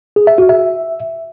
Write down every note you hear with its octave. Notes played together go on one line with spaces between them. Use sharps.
G#4
E5
F#4
E5